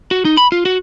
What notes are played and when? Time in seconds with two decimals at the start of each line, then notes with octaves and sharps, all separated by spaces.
0.11 F#4
0.25 D#4
0.37 B5
0.52 F4
0.65 F#4